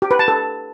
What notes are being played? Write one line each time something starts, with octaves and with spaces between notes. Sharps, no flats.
G4
B4
A5
A4